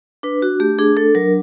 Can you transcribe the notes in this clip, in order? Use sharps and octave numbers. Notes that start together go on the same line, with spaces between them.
D4 B4
D4 F#4
A3 G4
D4 G#4
D4 A4
F#3 A#4